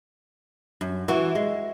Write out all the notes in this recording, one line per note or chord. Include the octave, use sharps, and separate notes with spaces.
F#2
E3 F#4
G#3